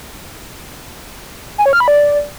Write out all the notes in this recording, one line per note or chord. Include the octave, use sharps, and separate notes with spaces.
G#5
C#5
F6
B5
D5